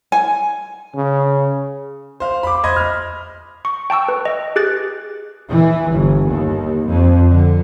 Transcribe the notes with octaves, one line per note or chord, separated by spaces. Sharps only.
G#5
C#3
C5 F5
B5 D6
C5 D#5 B5 D#6 G#6
B5 F6
C#6
G5 A5 C#6 E6
B4
D#5
G4 G#4 F#6 A6
E3
G1
D#2
F2
D3